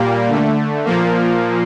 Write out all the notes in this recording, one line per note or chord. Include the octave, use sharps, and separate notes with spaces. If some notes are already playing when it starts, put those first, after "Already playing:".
Already playing: A#2 G3 A#3
D3 A3
A#2 F3 A#3